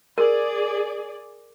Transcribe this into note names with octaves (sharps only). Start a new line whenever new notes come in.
G#4 A#4 D5